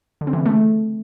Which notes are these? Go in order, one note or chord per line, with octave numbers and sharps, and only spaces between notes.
D3
C4
E3
C#3
A3